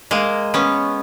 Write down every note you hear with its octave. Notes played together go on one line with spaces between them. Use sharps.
G#3 A#3
B3 C#4